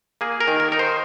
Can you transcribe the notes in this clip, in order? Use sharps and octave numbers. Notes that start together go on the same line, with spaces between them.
A#3 G#4
A#4
D#3
A#4
D#4 A#4
C5